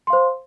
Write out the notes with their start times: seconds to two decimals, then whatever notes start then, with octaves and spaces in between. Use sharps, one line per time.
0.07 C6
0.10 F5
0.13 C5